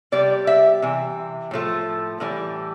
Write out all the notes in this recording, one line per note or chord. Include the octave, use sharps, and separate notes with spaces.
C3 G3 D5
E5
C3 E3
A2 F3 A3
A2 E3 G3